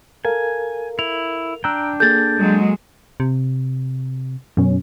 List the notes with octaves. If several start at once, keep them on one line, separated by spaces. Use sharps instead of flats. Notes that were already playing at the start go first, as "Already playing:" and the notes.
A4 A#4 F5 G#5
E4 F7
D4 G5 A#5 E6 F#6
A#3 G#4 A4 G6 A6
F#3 G#3
C3
F#2 B2 C#4